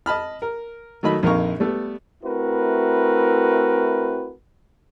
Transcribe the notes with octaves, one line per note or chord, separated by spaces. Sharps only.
D#5 A5 B5 F6
A#4
D#3 F#3 A3 D#5 B5
A#1 F2 D#4 A#4 F5 C#6
G3 A3 B3
A3 C4 E4 F#4 A#4 B4